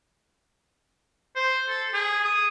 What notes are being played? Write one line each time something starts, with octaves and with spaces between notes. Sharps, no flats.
C5
A4
G#4
D#6